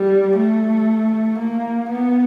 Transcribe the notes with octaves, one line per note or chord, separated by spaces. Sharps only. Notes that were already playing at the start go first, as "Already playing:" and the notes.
Already playing: G3
A3
A#3
B3